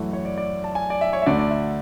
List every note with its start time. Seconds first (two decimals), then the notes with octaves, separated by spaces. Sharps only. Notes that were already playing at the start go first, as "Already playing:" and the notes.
Already playing: F#2 E3 A3 E5 F#5
0.13 C#5
0.25 D5
0.38 D5
0.64 A5
0.75 G#5
0.90 D5
1.01 E5
1.13 C#5
1.22 E5
1.26 D2 D3 A3 D5
1.39 D5
1.51 E5